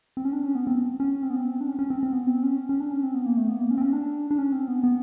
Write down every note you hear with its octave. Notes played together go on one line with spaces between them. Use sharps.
C4
C#4
D4
C#4
B3
C4
C#4
C4
B3
C4
D4
C#4
C#4
C4
C4
B3
C4
C#4
C#4
D4
C#4
C4
B3
A#3
A3
B3
A#3
C#4
C4
C#4
D4
D4
C#4
C4
B3
B3